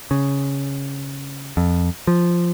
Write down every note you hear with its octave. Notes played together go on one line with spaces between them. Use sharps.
C#3
F2
F3